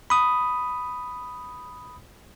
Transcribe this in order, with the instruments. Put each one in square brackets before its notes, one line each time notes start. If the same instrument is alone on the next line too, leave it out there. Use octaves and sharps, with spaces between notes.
[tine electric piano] B5 D#6